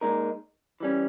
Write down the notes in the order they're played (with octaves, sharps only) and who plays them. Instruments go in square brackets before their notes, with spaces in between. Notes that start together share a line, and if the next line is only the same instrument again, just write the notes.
[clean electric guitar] A#2 G#3 D#4 A#4
E3 G3 C#4